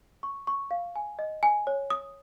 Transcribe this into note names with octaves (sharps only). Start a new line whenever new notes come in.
C#6
C#6
F5
G#5
D#5
G#5
C#5
D#6